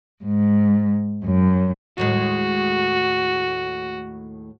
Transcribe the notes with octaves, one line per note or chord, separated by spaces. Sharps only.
G#2
F#2
D#2 A2 G#3 F#4